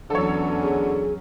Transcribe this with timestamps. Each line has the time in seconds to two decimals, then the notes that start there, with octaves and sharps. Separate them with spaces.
0.10 E2 D3 F#3 C#4 A4 C#5
0.62 G#4